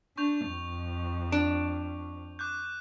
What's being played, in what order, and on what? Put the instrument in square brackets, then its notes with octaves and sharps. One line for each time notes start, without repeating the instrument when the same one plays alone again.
[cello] D4 [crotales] C#6 G6 F7
[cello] F2
[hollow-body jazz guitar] D4
[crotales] D6 F#6 G6